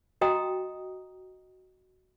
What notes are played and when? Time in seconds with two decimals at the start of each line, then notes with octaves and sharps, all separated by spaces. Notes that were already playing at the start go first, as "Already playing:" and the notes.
0.21 F#4 D#5 G5 A#5 D#6